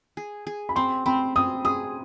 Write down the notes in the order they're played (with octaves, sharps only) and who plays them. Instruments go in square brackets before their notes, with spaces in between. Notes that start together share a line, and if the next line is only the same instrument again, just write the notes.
[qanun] G#4
G#4
[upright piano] B5
[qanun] C4 [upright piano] C6
[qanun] C4 [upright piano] B5
[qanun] C4 [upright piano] D#6
[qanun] G#4 [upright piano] D#6